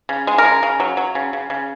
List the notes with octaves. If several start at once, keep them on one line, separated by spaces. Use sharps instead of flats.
C#3
G#3
A#4
C#3
C#3
F#3
F#3
C#3
C#3
C#3